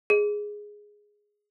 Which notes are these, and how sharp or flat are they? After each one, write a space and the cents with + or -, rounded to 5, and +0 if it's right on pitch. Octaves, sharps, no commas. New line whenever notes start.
G#4 +0